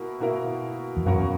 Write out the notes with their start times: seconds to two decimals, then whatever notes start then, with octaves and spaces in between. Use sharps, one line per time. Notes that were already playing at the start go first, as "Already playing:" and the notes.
Already playing: B2 A#3 E4 A#4
0.20 B2 A#3 E4 A#4
0.97 E2
1.06 F#2 B2 A#3 C#4 F#4 A#4